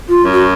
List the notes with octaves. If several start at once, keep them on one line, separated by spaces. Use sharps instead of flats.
F4
F#2
F#4